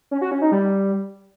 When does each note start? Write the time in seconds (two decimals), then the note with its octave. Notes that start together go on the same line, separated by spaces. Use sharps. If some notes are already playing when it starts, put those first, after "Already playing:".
0.11 C#4
0.21 F#4
0.31 C#4
0.42 D#4
0.52 G3